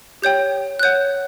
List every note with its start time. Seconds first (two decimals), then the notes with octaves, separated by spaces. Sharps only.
0.22 G4 C#5 G5 G6
0.79 F#6
0.83 C#5 F#5 G6